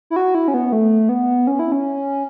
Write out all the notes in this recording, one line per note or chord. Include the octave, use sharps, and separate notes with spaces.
E4
F#4
E4
C#4
B3
B3
A3
B3
C#4
E4
C#4